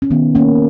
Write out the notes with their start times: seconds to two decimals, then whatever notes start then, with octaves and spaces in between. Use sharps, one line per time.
0.02 C#4
0.10 D#3 B3
0.35 A#3 C#4